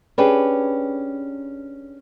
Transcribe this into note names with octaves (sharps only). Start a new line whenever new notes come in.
C#4 D4 G4 G#4 B4